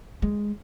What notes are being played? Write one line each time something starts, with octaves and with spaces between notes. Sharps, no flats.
G#3